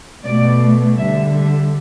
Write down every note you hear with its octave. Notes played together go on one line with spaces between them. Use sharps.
B2 A3 D5
D3 G3 E5
E5